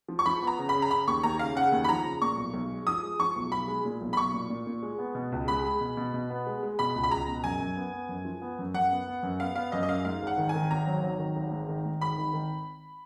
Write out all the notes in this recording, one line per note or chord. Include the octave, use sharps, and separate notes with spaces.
F3
C#6
F3 B5
B3 A#5
C#3
B5
C#3
A#5
C#3 B5
D#2 C#6
D#2 A#5
C#3 F5
C#3 F#5
D#2
B5
F3 A#5
C#3
A#2 C#6
B1
B1
G#3
F3 D#6
G#3
F3 C#6
B1
B1 B5
G#3
A#2
B1
B5
B1 C#6
A#2
A#2
A#2
G#3
B3
B2
C#2
G#3 B5
G#3
B2
B2
B2
B3
G#3
G#3
B2 B5
C#2
B5
C#2 A#5
B2
F#2 G#5
F#2
B3
B3
F#2
F3
B3
F#2
F#2 F#5
B3
B3
F#2
B3 F5
B3 F5
F#2 D#5
D#5
F#2 F5
G#2 F5
G#1
F#5
D#3
G#5
D#3
G#1 A#5
F#3
F#3
D#3
G#1
G#2
D#3
G#2
G#1 B5
D#3
D#3